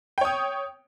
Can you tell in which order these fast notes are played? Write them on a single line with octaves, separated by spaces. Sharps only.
G5 C#5 D#6